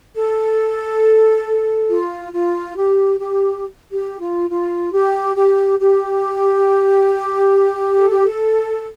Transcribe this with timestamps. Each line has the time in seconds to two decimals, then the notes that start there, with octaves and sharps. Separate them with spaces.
0.15 A4
1.89 F4
2.33 F4
2.76 G4
3.20 G4
3.92 G4
4.20 F4
4.50 F4
4.94 G4
5.37 G4
5.80 G4
7.97 A4
8.10 G4
8.24 A4